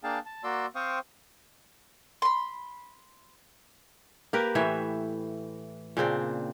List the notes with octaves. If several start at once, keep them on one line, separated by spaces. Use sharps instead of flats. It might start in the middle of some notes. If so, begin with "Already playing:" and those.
A#3 D4 G#4 F5 G5 A5
A5
A#3 F#4 D5 C6 E6
C4 C5 F5 G5 C#6 D#6
B5 C6
A#3 G4 A#4 B4
A2 E3 C#5 E5
A#2 C#3 C4 D4